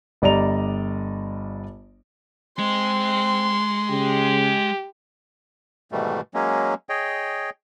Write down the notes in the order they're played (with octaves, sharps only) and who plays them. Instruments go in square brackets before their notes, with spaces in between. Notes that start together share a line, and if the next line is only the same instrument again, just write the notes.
[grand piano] G1 G3 D5 D#5 A#5 F7
[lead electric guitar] G#3 [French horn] C4 [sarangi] C6
[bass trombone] C#3 [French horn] G4
[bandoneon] G#2 B2 D#3 E3 G3 A3
F#3 G#3 A#3 C#4
G#4 C#5 D#5 G5